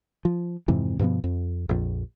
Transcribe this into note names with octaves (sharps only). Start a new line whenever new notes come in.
F3
F2 G#2 C3 E3
G2 B2 F3 B3
F2
A#1 F2